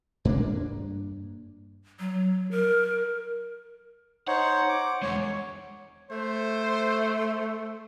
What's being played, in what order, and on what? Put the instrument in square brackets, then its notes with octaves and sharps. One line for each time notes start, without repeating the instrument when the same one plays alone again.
[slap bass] G2 A#3 D4
[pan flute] F#3
A#4
[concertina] D#4 C5 C#5 [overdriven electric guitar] F#5
[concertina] D6
[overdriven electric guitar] E2 G#3 [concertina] C#5
[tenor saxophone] A3 [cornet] C5